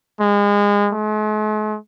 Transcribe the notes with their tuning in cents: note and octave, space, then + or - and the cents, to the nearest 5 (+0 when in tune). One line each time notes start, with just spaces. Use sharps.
G#3 -30
G#3 +45